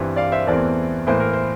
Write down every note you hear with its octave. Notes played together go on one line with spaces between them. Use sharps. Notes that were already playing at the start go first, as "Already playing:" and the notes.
Already playing: G2 E3 G3 C4
D5 F5
C5 E5
E2 E3 A3 C4 A#4 D5
A2 E3 A#3 C5
A#4
C5